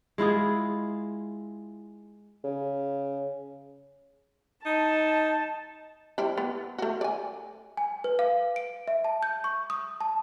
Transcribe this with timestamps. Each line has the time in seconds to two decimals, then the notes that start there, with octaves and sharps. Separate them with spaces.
0.18 G#3 E4 F4 G#4
2.44 C#3
4.65 D#4 A5
6.18 G3 C4 E4
6.38 B3
6.78 A3 F#4
7.01 D5 G#5
7.77 G#5
8.04 B4
8.19 F5
8.56 D7
8.88 E5
9.05 A5
9.23 G6
9.44 C#6
9.70 D#6
10.01 A5